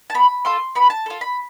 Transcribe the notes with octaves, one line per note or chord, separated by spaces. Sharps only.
A5
B3 B5
F4 A4 C6
B3 B5
A5
F4 A4
B5